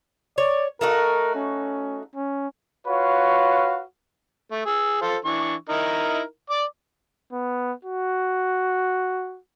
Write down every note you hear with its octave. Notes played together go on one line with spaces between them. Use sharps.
C#5 D5
A3 D#4 F#4 A#4
C#4
C#4
F4 F#4 B4 C#5 F5
A3
G#4 E6
F4 A4 C5
E3 D4 C#6
D#4 E4 A#4
D5 D6
B3
F#4